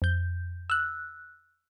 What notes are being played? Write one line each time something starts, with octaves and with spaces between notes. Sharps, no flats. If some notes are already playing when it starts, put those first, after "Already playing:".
F2 G6
E6 F#6